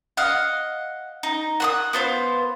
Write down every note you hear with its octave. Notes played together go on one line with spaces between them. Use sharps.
D#5 F5 F#5
D#4
F#5 C6 D#6
B3 F4 C5